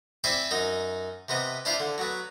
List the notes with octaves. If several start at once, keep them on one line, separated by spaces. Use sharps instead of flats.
C4 E4 C5 D5 E5 G#5
F#2 D#4 D#5
C3 B3 D#5
D4 E4 F4 C5 F5
D3
F#3 B3